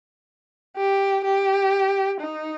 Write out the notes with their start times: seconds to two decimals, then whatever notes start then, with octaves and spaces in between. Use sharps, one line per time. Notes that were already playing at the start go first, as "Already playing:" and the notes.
0.77 G4
1.24 G4
2.21 D#4